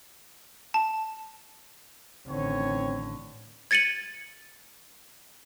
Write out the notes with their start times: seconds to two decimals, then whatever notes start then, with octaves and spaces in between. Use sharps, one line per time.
0.74 A5
2.27 A1 D3 D#3 C4 C#5
3.71 G#6 A6 C#7 D#7 F#7